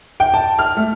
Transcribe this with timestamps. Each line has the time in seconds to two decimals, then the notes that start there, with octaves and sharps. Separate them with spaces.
0.20 G5
0.34 A5
0.59 F6
0.77 A3